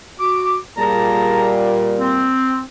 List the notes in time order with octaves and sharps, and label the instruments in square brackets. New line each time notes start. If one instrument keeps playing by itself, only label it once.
[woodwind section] F#4 D6
[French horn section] A#2 G3 A#3 [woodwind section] G#4 A5 A#5
[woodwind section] C4